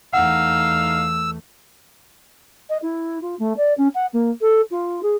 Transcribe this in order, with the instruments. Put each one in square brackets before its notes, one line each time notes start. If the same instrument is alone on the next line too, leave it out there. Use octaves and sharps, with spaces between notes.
[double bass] E2 A3 [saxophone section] D#4 F5 [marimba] F#5 [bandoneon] E6
[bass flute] D#5
E4
F4
A3
D5
C#4
F#5
A#3
A4
F4
G#4